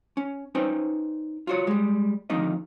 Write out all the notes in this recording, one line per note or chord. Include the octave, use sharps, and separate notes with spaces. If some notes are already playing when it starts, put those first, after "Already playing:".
C#4
C#4 D#4 B4 C5 G5
F4 F#4 C#5
G3 G#3
F2 B2 D3 D#3 A#3 D#4